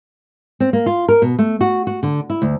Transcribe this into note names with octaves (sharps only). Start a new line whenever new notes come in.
C4
A#3
F4
A#4
B2
A3
F#4
F#4
D3
E4
D2